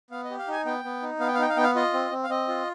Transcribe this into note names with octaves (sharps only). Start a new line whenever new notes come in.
B3 F5
D#5
G4
F5
D#4 G#5
B3 G5
B3
D#4
B3 F5
G5
F5
D#4 G5
F5
B3 G5
F5
F4 D#5
C4
C4
F5
C4 D#5
F4